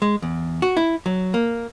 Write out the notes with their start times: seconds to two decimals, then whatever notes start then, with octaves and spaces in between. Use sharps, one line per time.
0.02 G#3
0.22 E2
0.62 F#4
0.77 E4
1.06 F#3
1.34 A#3